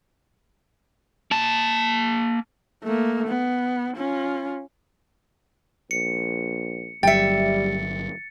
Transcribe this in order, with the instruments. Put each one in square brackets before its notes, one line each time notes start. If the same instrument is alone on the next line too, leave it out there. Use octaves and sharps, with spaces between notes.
[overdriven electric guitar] A#3 A5
[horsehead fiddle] A3 A#3
B3
C#4 F4
[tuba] A#1 [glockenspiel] C#7
[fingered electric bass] G1 F#3 [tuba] G3 [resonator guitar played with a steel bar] E5 G5 [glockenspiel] A6 C#7